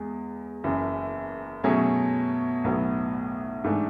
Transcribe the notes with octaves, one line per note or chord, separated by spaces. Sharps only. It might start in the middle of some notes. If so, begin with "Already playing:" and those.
Already playing: E2 G#3
F#1 F#2 E3
B2 F#3 A3 C#4 G#4
B1 A2 F#3 B3
G#2 E3 A3 D4